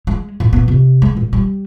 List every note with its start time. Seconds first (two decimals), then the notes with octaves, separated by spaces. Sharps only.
0.07 G#3
0.40 A#2
0.53 B3
0.68 C3
1.02 G#3
1.17 A#2
1.33 G3